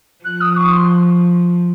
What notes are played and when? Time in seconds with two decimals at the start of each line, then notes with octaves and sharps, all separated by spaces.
0.25 F3 F#6
0.41 D#6
0.57 C#6
0.72 C6